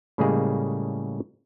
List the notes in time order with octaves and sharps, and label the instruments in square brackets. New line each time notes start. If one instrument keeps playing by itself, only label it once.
[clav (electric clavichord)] A2 C#3 G3 G#3 A#3 G#4